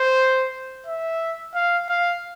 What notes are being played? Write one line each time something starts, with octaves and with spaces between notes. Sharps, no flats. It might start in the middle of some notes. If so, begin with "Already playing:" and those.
Already playing: C5
E5
F5
F5